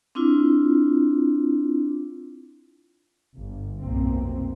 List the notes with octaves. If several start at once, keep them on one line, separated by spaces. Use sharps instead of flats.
C4 D4 E4 F4
G1
F1 B1 A#2 A#3 C4